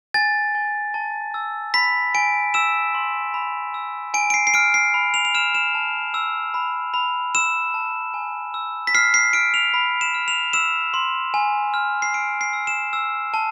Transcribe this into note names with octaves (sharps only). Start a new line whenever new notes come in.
G#5 A6
G#5
A5
E6
B5 B6
G#5 D7
E6 E7
C6
B5
E6
G#5 D7
D7
C7
C7
F6 D7
C7
B5
F7
F7
F6 E7
E7
A5
E6
B5
B5
E6 E7
A5
G#5
E6
B6
F6 C7
C7
F6 D7
F7
B5
E7
F6
F7
E6 E7
C6
G#5
F6
C7
E6 D7
C7
E6
E7
E6
A5